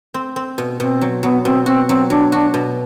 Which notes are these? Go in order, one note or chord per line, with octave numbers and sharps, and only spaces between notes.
C4
C4
B2
B2 C4
F#3
F#3 B3
B2 C4
C4 F#4
F#3 C4
F#3 D4
D4 F#4
B2